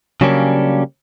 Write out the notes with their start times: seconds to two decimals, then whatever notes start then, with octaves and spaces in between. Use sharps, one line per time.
0.21 C#3 F#3 G3 A#3 C#4 D4